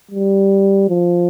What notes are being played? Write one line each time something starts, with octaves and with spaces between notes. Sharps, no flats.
G3
F3